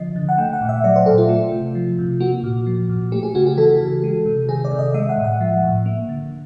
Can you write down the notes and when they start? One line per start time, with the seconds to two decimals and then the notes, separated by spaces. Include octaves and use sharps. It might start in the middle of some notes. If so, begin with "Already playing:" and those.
Already playing: D3 F3 D#5
0.16 D3
0.29 F#5
0.38 A3 G5
0.53 F#5
0.61 A#2
0.69 E5
0.84 F#3 D5
0.96 C5
1.06 A#2 A4
1.18 F4
1.29 A3
1.52 C3
1.75 F3
1.99 C3
2.20 A#3 F#4
2.43 A#2
2.66 F3
2.89 A#2
3.12 A3 G4
3.23 G#4
3.35 C#3 F#4
3.46 G4
3.57 E3 A4
3.81 C#3
4.04 G#3
4.26 C3
4.49 D#3 G#4
4.65 D5
4.71 C3
4.79 D#5
4.94 G#3 E5
5.09 F#5
5.18 A2
5.24 F#5
5.40 F3
5.64 A2
5.86 A#3
6.09 D3